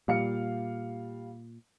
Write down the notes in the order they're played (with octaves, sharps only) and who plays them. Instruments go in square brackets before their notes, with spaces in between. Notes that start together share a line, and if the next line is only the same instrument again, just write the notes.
[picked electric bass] A#2 [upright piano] G3 F5 C#7